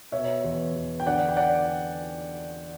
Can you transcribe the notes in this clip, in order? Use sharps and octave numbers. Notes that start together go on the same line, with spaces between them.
B2 C#5 E5
E2
E2
G5
D3 D5 F#5
G5
D5 F#5